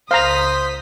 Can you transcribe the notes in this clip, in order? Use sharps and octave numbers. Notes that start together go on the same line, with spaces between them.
C#2 C5 F5 A#5 D#6 B6